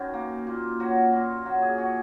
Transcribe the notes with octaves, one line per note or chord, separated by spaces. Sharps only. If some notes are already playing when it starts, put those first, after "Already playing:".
Already playing: F#2 D#3
A#3
A#2
F#3 F#4
A#2
F#3 F#4
G#4
F#4